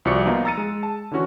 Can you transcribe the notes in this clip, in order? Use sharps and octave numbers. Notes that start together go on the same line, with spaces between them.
C2 F3 F#4 D5 C#7
F3 A#3 B3 D#4 F4
A#5 E6 A6 C#7 D#7
G#3
A5
D3 E3 C#4 F#4